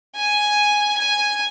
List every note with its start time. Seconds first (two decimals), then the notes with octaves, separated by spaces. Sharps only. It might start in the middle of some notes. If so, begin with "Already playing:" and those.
0.16 G#5
0.97 G#5